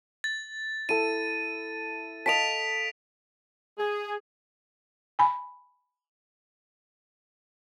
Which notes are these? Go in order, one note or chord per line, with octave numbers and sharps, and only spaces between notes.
A6
E4 A4 D#7
D#5 F5 A5 B6 D7 F7
G#4
G#5 B5